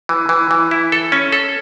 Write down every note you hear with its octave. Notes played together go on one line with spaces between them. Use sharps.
E3
E3
E3
E4
A4
C#4
A4